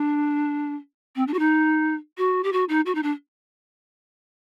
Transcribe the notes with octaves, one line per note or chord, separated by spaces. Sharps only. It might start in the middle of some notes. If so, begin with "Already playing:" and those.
Already playing: D4
C4
D4
F#4
D#4
F#4
G4
F#4
D#4
F#4
D#4
D4